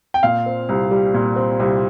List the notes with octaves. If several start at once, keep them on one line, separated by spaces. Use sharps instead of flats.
G5
A#2 F5
C4
C2
G3
A#2
C4
C2